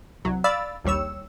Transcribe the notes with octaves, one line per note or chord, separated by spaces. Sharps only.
C2 F#3
D5 F5 B5 E6 A6
A#1 D#2 G3 C#5 E6